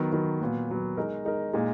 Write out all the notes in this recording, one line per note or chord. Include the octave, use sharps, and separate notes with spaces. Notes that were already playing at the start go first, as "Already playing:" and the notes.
Already playing: D#3 F#3 B3
D#3 F#3 B3
A#2 F#3 B3
A#2 F#3 B3
G#3 D#4 A#4
G#3 D#4 A#4
A#2 G#3 D#4